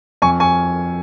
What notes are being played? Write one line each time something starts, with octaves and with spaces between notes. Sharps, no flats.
F2 G#5 C#6
G#5 C#6